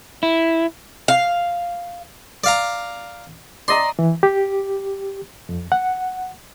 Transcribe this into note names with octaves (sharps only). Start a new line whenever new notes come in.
E4
F5
D5 F5 A#5
D5 D#5 A#5 C6
E3
G4
F2
F#5